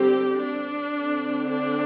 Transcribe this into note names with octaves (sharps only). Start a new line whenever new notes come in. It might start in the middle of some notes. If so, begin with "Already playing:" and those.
Already playing: D3 G3 C4 G4
D4
D3 C4
D4